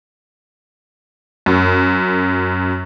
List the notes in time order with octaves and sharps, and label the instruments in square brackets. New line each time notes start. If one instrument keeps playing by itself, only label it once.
[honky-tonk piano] F#2